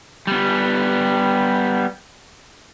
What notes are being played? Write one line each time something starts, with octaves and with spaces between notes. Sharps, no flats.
G3 B3